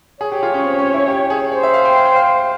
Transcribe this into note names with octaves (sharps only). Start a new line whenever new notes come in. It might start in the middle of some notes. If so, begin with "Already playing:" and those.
G#4 C#5
G4
F4
C#4
C4
C#4
E4
G4
G#4
C5 C#5
E5
F5
G5
F5
G5
F5